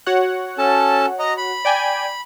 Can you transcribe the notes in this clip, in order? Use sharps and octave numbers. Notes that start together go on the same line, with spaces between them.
F#4 C#5 F#5
C#4 A4 A5
D#5 A#5
B5
D5 G5 G#5